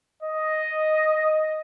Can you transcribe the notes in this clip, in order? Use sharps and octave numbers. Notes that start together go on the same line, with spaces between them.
D#5